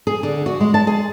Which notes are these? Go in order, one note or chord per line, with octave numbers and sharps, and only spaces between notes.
G#4
D3
F#4
G#3
A5
G#4